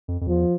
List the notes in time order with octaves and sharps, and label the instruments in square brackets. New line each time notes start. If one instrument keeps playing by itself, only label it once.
[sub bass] F2
F2
[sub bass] E2 [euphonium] F3